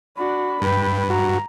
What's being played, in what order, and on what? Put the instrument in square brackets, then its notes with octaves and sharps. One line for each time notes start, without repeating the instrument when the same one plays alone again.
[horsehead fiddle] D4 F#4 [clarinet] B5
[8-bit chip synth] G2 [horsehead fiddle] B4 G5
[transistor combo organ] F#4 [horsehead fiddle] A#5